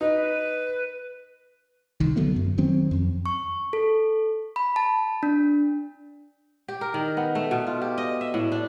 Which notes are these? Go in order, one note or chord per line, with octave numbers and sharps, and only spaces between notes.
D#4 B4
C2 D#3
D3 F#3 A3 B3
F#2
D#3 F#3 C4 C#4
F2
C#6
A4
B5
A5
D4
G4
A#4
D#3
B3
A3
B2
F4
G4
D#5
E5
A2
D4